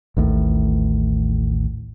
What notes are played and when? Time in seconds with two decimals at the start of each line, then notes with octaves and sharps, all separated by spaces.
0.17 A1 D#2 A2